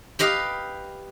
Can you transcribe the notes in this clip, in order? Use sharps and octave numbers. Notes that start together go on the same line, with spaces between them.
G4 B4 D#5 F5